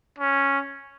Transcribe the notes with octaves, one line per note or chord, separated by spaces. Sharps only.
C#4